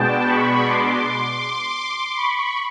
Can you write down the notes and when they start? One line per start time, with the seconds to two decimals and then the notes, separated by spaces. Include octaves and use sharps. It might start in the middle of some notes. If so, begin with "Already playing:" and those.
Already playing: B2 G#3 B3 D4 G5 A5
0.27 B5 C#6
0.64 C6 D6
2.17 B5 C#6